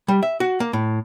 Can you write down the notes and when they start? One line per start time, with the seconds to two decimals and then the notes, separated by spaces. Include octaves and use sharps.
0.08 G3
0.23 E5
0.40 F#4
0.60 A#3
0.73 A2